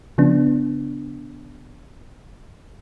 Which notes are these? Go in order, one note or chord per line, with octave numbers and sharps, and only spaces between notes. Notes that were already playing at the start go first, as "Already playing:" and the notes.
C#3 F3 B3 D4